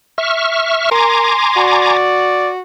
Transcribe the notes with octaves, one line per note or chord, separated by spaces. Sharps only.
E5 C#6 F6
A#4 G#5 A#5 C6 D6
F#4 D5